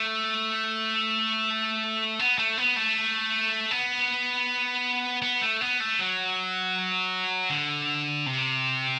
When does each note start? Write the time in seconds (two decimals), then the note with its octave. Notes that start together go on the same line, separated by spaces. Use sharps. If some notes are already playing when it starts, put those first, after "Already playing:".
Already playing: A3
2.19 B3
2.38 A3
2.58 B3
2.76 A3
3.71 B3
5.22 B3
5.41 A3
5.61 B3
5.80 A3
5.99 F#3
7.50 D3
8.26 C3